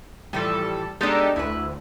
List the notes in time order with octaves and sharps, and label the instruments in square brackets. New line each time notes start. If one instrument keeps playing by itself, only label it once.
[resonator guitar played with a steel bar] A2 E3 F3 [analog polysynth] G3 A4
[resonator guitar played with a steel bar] G#3 B3 D4 [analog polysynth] D#4 G4 A4
[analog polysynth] D2 [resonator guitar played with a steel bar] E4 B4